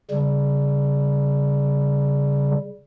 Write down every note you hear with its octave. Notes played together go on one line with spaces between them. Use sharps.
C#3 G3